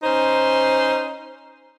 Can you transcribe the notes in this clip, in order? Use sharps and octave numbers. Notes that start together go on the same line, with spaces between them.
C#4 D#4 C5